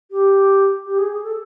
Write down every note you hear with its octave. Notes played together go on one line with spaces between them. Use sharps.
G4
G4
G#4
G#4
A4